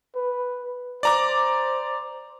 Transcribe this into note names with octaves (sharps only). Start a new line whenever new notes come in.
B4
C5 D5 A#5 D6